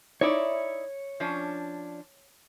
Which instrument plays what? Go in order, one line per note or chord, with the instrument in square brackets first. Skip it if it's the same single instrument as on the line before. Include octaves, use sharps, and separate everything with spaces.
[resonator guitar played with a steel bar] D#4 E4 D5 [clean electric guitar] C#5
[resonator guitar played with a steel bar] F3 C#4 D4